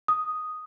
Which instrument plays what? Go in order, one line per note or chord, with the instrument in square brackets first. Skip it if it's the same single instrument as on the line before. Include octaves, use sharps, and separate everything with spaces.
[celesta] D#6